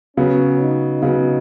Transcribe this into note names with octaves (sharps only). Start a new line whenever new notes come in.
C#3 F#3 B3 C#4
D#4
C#3 F#3 B3